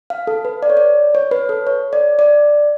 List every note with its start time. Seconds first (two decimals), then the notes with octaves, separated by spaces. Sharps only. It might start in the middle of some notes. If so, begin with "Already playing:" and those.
0.10 F5
0.27 A4
0.45 B4
0.63 D5
0.70 C#5
0.77 D5
1.15 C#5
1.31 B4
1.49 A4
1.67 C#5
1.93 D5
2.19 D5